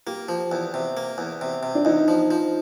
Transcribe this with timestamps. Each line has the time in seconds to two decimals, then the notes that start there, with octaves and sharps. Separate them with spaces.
0.07 A#3 G4
0.29 F3
0.52 E2
0.74 C3
0.97 A#3
1.18 E2
1.41 C3
1.63 C3
1.75 D4
1.85 E2 D#4
2.08 F3
2.31 F3